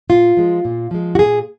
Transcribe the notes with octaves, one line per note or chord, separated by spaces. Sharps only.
A#2 F4
F3 G#3
A#2
F3 G#3
F#4
A#2 G#4